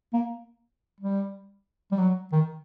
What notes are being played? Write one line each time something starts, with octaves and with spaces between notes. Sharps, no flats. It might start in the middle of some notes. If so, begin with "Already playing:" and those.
A#3
G3
G3
F#3
D#3